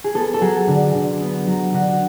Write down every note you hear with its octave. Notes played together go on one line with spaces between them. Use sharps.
G#4
B3 A4
A4
F#3 G#4
D3
D3
B3
F#3
D3 F#4